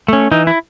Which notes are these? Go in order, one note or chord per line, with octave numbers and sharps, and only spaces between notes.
A3 C#4
E3 D#4
E4